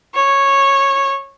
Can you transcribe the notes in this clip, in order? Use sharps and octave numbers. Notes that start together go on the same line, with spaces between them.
C#5